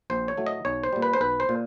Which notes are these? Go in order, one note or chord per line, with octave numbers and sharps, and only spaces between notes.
A#1 C5
C#5
A2 F#3 A3
D#5
B1 C#5
C5
A#2 G3
B4
C5
B1 B4
C5
A#2